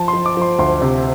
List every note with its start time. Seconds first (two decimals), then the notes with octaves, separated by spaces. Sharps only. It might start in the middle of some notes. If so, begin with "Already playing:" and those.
Already playing: F3 A5
0.08 C6
0.13 F3
0.26 D6
0.37 F3 C6
0.58 D2 C6
0.81 C3